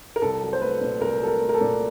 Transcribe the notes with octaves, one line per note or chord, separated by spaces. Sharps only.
A#4
C2 A4
F#3
C5
A3 B4
A#2
C2 A#4
F#3 A4
A#4
A3
A#4
A4
A#2